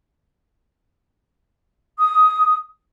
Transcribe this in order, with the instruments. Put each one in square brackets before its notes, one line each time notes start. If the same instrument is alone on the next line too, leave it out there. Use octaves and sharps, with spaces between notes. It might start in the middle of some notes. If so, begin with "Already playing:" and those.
[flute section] D#6